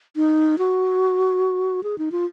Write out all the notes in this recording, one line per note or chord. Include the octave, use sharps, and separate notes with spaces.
D#4
F#4
G#4
D#4
F4